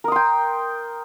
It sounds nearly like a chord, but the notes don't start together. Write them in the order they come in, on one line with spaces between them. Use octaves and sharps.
A#4 D#6 C6 G5